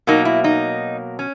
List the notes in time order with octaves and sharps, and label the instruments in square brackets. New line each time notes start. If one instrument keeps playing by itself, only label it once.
[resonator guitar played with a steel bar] B2 F#3 A#3 D#4
E4
D#4
C#4